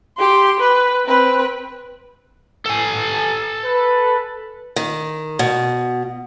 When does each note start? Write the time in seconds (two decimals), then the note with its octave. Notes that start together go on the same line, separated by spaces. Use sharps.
0.18 G4 C6
0.60 B4
1.06 C4 B4
2.66 A4 G#5
3.65 B4
4.76 D#3
5.39 B2